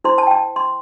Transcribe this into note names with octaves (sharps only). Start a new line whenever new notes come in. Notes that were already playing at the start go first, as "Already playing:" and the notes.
E4 C5 C6
A5
G5
A5
C6